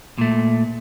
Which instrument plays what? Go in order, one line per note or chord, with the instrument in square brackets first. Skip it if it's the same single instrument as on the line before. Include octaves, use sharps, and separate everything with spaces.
[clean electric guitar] A#2 A3